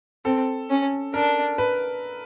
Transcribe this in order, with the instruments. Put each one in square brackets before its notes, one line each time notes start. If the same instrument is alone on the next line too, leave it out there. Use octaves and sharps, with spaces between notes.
[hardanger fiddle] C4 [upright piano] A4
[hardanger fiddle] C#4
[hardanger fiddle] D4 [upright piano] A#4
[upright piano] B4